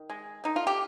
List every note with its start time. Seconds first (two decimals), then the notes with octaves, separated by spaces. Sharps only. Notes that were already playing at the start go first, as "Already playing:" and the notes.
Already playing: D#3
0.10 G#3
0.44 D3 D#4
0.56 F4
0.67 G4